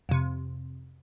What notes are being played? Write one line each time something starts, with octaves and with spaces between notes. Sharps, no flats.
F2 C3